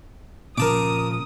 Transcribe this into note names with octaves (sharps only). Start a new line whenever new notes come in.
A#2 C#3 F3 A#4 A5 D6 D#6